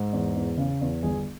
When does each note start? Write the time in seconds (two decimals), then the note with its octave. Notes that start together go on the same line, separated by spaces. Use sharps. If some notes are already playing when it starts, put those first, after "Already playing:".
Already playing: G#2
0.13 E2
0.36 E2
0.57 C#3
0.81 E2
1.03 G1 G#4